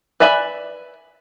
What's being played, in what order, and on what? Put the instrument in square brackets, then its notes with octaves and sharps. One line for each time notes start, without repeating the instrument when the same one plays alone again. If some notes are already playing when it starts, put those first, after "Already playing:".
[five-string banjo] B4 D5 E5 G#5 B5